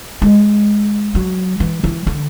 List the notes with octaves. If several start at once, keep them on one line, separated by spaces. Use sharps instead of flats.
G#3
F#3
E3
E3
D3